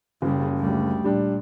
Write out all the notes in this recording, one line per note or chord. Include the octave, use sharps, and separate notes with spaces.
F#1 C#3 G3
D2 G3
A#2 G3 D4